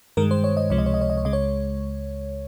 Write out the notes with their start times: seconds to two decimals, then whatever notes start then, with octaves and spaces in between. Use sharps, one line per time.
0.17 G2 D#3 G#3 A#4
0.31 C5
0.44 C#5
0.57 D#5
0.70 C#2 C3 F3 G#3 C#5
0.78 D#5
0.86 C#5
0.94 D#5
1.01 C#5
1.10 D#5
1.17 C#5
1.24 C#2 C#3 G#3 D#5
1.33 C#5